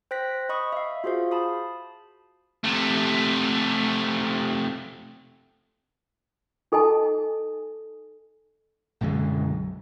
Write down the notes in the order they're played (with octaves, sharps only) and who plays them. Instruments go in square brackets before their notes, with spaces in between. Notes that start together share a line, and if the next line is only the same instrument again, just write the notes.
[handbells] C5 G5 F#6 A#6 B6
D#5 B5 C#6 D#6
E5 F5
F4 F#4 G#4 C5 F5
A5 B5 D#6
[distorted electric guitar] C3 A3
[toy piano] D#4 A4 D#5 G#5 A5
[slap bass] B1 F#2 D3 G#3